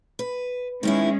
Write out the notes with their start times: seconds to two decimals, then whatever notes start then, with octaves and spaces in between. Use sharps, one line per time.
0.19 B4
0.83 D#3 G#3 B3 C#4 E4